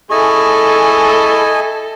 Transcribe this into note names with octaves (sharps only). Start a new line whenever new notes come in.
E4 G#4 A4 D#5 G#5 C#6